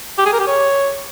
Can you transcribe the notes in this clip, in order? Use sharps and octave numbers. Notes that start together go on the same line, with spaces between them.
G4
G#4
A#4
G4
C#5